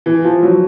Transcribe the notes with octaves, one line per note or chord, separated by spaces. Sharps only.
E3
F3
F#3